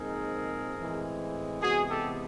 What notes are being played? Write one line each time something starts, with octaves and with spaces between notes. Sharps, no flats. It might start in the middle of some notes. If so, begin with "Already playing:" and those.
Already playing: A#2 F3 G#3 C4 D#4 G#4 A#4
A2 E3 G#3 C4
C3 E3 G#3 B3 F#4 G#4
G4 A4